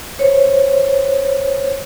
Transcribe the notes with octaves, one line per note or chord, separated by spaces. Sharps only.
C5 C#5